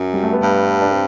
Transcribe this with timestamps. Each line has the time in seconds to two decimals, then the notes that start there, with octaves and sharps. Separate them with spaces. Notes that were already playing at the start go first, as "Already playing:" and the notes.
Already playing: F#2
0.13 G3
0.23 A3
0.33 B3
0.43 G2
0.81 D4
0.91 C4